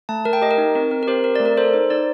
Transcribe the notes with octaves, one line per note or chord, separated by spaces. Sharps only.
A3 A5
A3 A#4
G5
G4 D#5
A#4
D#4
C4 A#4
C4 A#4
A#4
G4 C5
C4 A#4
A3 D5
A#4
A4 C5
D#4 C5
D#4 D5